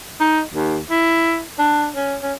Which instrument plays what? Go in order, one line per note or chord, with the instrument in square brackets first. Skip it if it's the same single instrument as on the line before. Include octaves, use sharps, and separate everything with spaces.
[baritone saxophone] D#4
D#2
E4
D4
C#4
C#4